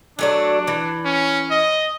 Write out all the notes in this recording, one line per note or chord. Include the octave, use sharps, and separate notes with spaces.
F#3 A3 D4 D5
E3
C#4
D#5